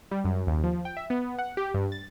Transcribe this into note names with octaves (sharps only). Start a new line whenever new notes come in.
G3
F#2
D#2
F3
G5
E5
B3
F#5
G4
G2
A6